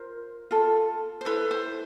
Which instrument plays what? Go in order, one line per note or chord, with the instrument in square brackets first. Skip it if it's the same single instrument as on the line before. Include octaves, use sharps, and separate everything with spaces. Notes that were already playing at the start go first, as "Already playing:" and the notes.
Already playing: [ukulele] F4 A#4 C5
F4 A4
C5
E4 A4 B4
C5